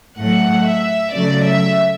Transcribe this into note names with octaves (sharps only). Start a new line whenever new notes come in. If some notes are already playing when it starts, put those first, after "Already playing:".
A2 F#3 A3 F#5
E5
C#3 F#3 A3 D5
E5